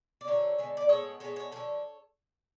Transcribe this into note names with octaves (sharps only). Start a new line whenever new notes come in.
D5
D3 F#3 A3 A4 C#5
D3 G#3 B3
D5
A2 G#3 B3 A4 C#5
D3 G#3 B3 A4 C#5
A4 C#5
D3 F3 A3 A4 C#5